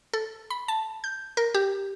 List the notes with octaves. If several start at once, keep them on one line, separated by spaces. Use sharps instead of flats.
A4
B5
A5
G6
A#4
G4